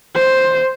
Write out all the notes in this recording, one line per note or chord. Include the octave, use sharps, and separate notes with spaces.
C5